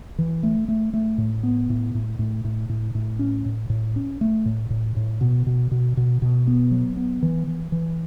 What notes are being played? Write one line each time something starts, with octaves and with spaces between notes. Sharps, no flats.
E3
A3
A3
A3
A2
B3
A2
A2
A2
A2
A2
A2
C#4
A2
A2
C#4
A3
A2
A2
A2
B2
B2
B2
B2
B2
B3
F#3
B3
E3
E3
E3